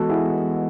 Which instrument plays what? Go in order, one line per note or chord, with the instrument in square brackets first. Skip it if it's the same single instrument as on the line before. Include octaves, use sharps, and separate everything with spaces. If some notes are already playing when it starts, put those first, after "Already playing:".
Already playing: [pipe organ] E3 G#3 B3 [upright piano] F#4 A4
[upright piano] E4 G#4